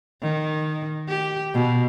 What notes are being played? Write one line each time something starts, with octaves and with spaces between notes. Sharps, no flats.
D#3
G4
B2